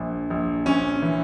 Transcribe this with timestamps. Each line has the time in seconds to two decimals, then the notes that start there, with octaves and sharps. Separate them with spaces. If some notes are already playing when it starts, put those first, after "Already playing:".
Already playing: A#1
0.30 A#1
0.66 A#1 C#4
1.02 E3